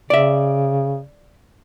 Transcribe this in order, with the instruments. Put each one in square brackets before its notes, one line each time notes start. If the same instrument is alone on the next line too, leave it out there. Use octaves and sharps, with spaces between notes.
[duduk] C#3 [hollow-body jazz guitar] D5 E5